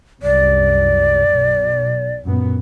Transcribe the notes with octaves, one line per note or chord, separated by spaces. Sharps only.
C2 F#2 D5
B1
F#2 A#2 B3